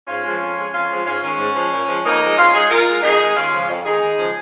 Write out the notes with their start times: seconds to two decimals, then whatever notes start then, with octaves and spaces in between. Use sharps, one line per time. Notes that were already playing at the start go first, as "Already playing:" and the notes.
0.07 G#2 C#4 F4
0.23 F3 G#3
0.40 F2
0.56 F3 G#3
0.73 F2 C#4 F4
0.90 F3 G#3
1.05 G#2 C#4 F4
1.22 D#3 G#3 C#4
1.38 G#2
1.55 F3 G#3
1.71 A#2
1.88 F3 G#3
2.04 F2 A#3 D#4
2.20 F3 G#3
2.37 G#2 C#4 F4
2.53 G#3 D#4 G#4
2.70 A#2 F4 A#4
2.86 G#3
3.03 F2 D#4 G#4
3.19 D#3 G#3
3.35 D#2 C#4 F4
3.52 C#3 F3 G#3
3.69 F2
3.85 D#3 G#3 D#4 G#4
4.01 D#2
4.17 C#3 F3 G#3